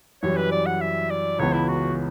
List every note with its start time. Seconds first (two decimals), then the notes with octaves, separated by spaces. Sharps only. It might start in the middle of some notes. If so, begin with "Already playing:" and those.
0.22 F#2 E3 G3 C#5
0.37 B4
0.51 D5
0.66 F#5
0.81 E5
1.10 D5
1.39 C#2 C#3 E3 B3 C#5
1.53 E4
1.68 F#4